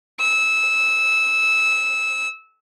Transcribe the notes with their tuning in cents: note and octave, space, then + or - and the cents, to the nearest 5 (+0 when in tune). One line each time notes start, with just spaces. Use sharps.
E6 -15